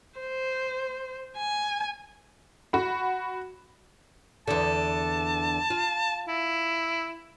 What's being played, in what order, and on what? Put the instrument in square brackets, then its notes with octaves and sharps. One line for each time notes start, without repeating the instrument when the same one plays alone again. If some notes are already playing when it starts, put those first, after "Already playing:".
[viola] C5
G#5
[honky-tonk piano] F#4 B5
[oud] E2 D3 [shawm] A5
[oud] F4
[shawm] E4